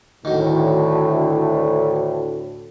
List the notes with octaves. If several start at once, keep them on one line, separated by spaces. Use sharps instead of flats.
D2 A2 D#3 F#3